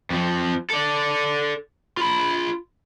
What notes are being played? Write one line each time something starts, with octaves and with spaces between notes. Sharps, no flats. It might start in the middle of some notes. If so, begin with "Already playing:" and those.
F2 F3
A4 D5
F4 B5